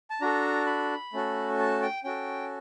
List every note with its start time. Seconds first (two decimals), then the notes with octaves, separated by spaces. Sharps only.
0.10 A5
0.21 D4 F#4 A4 A#5
0.66 B5
1.13 A3 C#4 F#4 A4
1.59 A5
1.82 G5
2.04 C#4 F#4 A4 G5